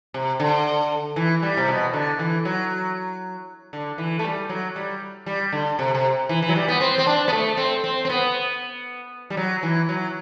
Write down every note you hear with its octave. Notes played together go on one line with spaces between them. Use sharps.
C3
D3
E3
G3
C3
B2
D3
E3
F#3
D3
E3
A3
G3
F#3
G3
G3
D3
C3
C3
E3
E3
F#3
G3
B3
C4
C4
D4
B3
A3
C4
C4
C4
B3
G3
F#3
E3
F#3